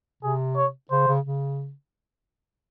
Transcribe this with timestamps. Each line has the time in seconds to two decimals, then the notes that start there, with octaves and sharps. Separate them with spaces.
0.23 C3 G#4
0.56 C#5
0.91 C#3 C5
1.08 C#3
1.25 C#3